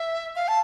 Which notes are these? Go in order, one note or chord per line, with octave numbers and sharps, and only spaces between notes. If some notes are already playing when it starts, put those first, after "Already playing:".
Already playing: E5
F5
A5